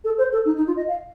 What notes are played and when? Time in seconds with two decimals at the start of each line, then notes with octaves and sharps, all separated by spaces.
0.04 A4
0.18 C5
0.32 A4
0.45 D#4
0.56 D#4
0.67 F4
0.76 D#5
0.88 F5